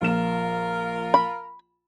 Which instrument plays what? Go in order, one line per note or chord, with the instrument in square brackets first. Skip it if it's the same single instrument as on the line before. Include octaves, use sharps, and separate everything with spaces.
[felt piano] A#1 E7 [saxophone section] F4 A#4
[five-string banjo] B5